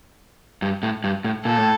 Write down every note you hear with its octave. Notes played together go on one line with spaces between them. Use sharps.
G2
A2
G2
A2
A#2 A4
A2